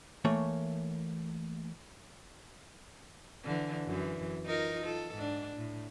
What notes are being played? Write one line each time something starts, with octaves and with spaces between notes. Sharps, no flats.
E3 A3 A#3 C#5
D3 E3
F#2 E3
D#4 F4 A#4
F4 A4
G#2 D4
A2